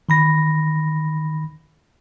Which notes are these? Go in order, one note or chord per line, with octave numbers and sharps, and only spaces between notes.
D#3 B5 A#6